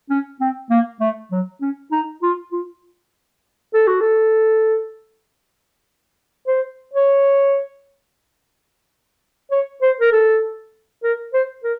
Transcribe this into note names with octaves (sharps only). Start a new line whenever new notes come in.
C#4
C4
A#3
A3
F#3
C#4
D#4
F4
F4
A4
F#4
A4
C5
C#5
C#5
C5
A#4
A4
A#4
C5
A#4